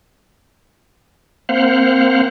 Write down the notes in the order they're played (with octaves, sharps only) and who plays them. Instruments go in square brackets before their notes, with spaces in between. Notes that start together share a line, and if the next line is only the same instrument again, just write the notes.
[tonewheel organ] A#3 C4 C5 F5 F#5